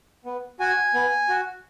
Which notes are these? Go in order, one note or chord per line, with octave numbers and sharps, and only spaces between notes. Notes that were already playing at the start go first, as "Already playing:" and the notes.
B3
F#4 G#5
B3
F#4